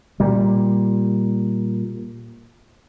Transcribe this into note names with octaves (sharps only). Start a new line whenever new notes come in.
A#2 G3